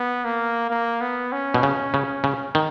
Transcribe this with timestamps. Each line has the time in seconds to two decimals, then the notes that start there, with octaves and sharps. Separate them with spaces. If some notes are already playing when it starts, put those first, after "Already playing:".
Already playing: B3
0.24 A#3
0.70 A#3
1.01 B3
1.32 C#4
1.54 B2
1.63 C#3
1.94 C#3
2.24 C#3
2.55 D#3